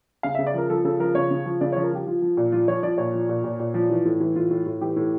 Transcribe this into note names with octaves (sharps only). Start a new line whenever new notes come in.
C#3 F5
E5
C#3
D5
F3 A#4
F3 A4
C#3 A4
F3 A#4
C#3 C#5
C#3
F3
C#3 D5
C#5
F3
A#4
F3 G4
F3 F4
F3
A#2
F3 F4
F3 C#5
F3 D5
A#2 C#5
F3
A#2
A#2
A#2
F3
E3
A2
E3
A2 F4
A2
A2
E3 G4
A2